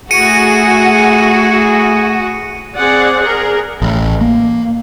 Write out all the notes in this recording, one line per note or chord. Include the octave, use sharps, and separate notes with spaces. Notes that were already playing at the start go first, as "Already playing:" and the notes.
A3 E4 F#4 G#4 C#7 D#7
C4 G#4 D5 F#5
G#4 A#4
A1
A#3